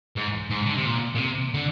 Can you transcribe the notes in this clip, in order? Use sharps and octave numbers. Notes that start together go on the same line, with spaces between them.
G#2
G#2
D3
C3
A#2
A#2
C3
D3